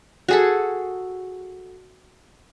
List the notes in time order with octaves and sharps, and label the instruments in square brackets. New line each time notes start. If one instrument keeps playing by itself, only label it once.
[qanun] F#4 G#4 A4